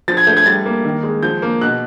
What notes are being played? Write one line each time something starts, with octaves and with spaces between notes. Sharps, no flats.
F3 A6
G#6
A3 G6
G#6
G3 A6
A#3
D#3
G#3
F3 G6
A#3
B2 F#6